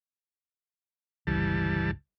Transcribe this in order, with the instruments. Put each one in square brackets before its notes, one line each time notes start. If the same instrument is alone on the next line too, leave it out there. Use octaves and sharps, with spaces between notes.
[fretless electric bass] G1 C#2 [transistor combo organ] E3 G3 A5